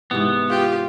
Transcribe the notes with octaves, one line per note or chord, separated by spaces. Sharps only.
G#2 C3 E3 B3
F4 G4